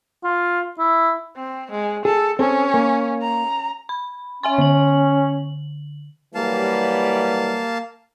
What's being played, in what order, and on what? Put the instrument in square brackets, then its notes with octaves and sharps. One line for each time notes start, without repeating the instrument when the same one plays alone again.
[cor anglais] F4
E4
[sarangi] C4
G#3
[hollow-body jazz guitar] G#4 [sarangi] A4
[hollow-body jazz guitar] C4 A4 [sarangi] C#4
[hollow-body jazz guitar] A#3
[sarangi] A#5
[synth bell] B5
[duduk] C#4 [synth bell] E5 G#5 C6
[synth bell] D3 F#7
[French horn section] E3 F#3 G3 [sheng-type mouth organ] A#3 F5 A5